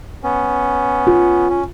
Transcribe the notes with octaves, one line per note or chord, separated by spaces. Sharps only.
B3 C#4
F4
C#4